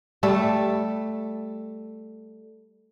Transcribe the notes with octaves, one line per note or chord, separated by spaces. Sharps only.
G3 A3 A4